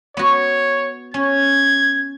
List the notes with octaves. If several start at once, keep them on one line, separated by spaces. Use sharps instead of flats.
B3 F#4 C#5
C#4 G#6